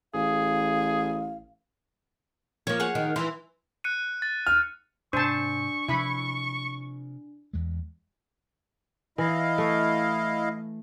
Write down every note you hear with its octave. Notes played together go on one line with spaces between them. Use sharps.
A1 G#4 F5
F3 A#3 C#5
G#4 C#5 F#5
D#3
E3 C6
F#6 C#7 D#7
A6
F6
G#2 C3 D4 C5 A5 C#6
C3 F3 E4 B5
E2 G#3
E3 E4 D#5 F5
A3